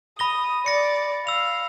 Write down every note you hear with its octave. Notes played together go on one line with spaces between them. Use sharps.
B5 D#6 A#6 G7
D5 A#6 C#7
F5 E6 F7